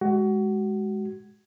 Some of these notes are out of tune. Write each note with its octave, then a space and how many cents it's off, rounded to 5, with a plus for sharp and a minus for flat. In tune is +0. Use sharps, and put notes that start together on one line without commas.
G#3 +0 F#4 +25